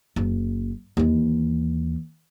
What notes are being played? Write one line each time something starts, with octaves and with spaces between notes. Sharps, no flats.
F#1
D#2 E3